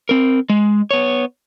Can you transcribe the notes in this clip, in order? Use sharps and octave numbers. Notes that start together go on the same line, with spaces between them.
C4 A#4
G#3
B3 C#5